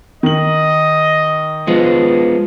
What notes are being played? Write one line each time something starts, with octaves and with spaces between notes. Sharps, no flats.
D#3 D#5 F#7
F3 G#3 B3